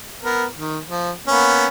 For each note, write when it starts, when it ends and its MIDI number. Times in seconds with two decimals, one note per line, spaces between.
0.23 0.46 59
0.23 0.46 70
0.56 0.79 51
0.87 1.12 53
1.27 1.67 58
1.27 1.67 59
1.27 1.67 61